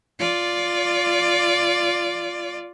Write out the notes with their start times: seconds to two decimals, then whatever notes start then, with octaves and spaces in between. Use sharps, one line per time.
0.19 F4 D5